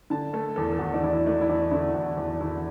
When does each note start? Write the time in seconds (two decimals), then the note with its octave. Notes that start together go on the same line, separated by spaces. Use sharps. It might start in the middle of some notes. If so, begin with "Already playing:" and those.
0.10 D3 A5
0.33 A3 A4
0.56 E2 A4
0.72 A4
0.79 E2 F#4
0.94 D4
1.03 E2 E4
1.26 A3 D4
1.41 E4
1.49 E2 D4
1.71 D3 E4
1.94 E2 F#4
2.17 E2
2.40 E2 E4